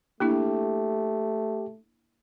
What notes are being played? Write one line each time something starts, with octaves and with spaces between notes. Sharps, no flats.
A3 A#3 D4 E4 G4